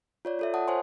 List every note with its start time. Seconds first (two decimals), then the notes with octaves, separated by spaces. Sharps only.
0.25 F4 C#5 D5
0.39 F4 A4 E5
0.54 F#5 A5 D#6
0.68 C5 C#5 G#5 C6